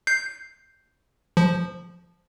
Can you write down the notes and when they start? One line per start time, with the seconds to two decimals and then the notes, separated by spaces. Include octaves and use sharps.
0.07 G6 C7
1.37 F3